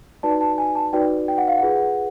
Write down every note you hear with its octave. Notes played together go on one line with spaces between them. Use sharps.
D#4 F#4 B4 D5 A5
A5
G#5
A5
D#4 F#4 B4 D5 G5
G5
F#5
F5
F4 G#4 B4 F#5